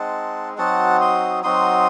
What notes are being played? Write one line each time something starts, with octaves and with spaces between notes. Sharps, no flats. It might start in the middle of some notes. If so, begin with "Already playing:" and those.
Already playing: G#3 C4 D#4 F#5 A5
F#3 C4 D#4 F#4 F#5 A5
C6 D#6
F#3 C4 D#4 F#4 C6 D#6